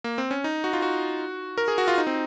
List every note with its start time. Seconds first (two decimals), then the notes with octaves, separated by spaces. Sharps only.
0.04 A#3
0.18 C4
0.31 C#4
0.44 D#4
0.64 F#4
0.73 F4
0.82 F#4
1.58 A#4
1.68 G#4
1.78 F#4
1.88 F4
1.98 D#4
2.07 C4